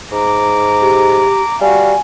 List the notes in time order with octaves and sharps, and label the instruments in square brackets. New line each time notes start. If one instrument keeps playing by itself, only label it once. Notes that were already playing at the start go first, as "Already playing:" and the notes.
[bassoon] G#2 [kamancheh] A#5 D6
[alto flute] G4
[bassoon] G3 [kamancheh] F#4 F5 [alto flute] G#5